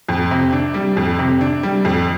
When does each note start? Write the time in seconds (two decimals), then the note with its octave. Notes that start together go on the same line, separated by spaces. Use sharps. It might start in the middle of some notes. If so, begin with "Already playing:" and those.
0.09 F2
0.31 C3
0.52 D4
0.74 G3
0.97 F2
1.19 C3
1.41 D4
1.63 G3
1.85 F2